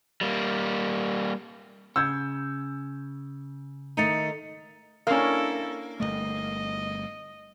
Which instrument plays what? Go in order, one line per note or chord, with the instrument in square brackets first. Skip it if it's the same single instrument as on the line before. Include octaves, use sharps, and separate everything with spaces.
[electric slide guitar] G3 A#3
[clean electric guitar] C#3 [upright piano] E6 G6 G#6
[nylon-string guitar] D#3 A3 D#4 [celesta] A6 C#7 D#7
[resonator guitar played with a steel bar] A#3 [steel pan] C#4 F5 [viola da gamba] D4 E4 A4
[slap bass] G1 F2 A3 [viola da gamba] D#5